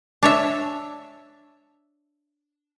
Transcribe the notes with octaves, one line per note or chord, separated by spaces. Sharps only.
D4 C#5 E5